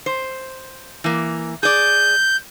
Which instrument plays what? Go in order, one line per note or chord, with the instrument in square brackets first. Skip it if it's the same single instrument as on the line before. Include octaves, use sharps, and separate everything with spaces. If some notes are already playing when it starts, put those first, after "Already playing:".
[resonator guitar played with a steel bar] C5
E3 A#3
[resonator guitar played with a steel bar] G#4 D5 [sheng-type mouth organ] G6